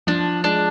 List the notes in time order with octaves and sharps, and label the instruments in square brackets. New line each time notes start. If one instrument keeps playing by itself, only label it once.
[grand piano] F3 [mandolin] D4
[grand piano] G#3 [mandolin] D4